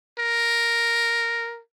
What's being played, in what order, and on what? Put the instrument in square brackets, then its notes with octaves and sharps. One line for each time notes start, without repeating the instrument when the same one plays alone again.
[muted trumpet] A#4